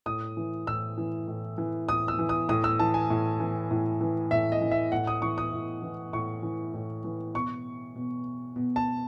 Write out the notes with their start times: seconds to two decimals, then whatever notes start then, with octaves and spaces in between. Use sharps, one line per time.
0.06 A2 D#6
0.37 E3
0.67 A2 E6
0.98 E3
1.28 A2
1.58 E3
1.88 A2 D#6
2.08 E6
2.19 E3
2.29 D#6
2.49 A2 D#6
2.64 E6
2.79 E3 A5
2.94 G#5
3.10 A2
3.40 E3
3.71 A2
4.01 E3
4.31 A2 E5
4.52 D#5
4.62 E3
4.71 E5
4.92 A2 F#5
5.07 D#6
5.22 E3 C#6
5.38 D#6
5.53 A2
5.83 E3
6.13 A2 C#6
6.43 E3
6.74 A2
7.04 E3
7.34 B2 C#6
7.96 B2
8.56 B2
8.76 A5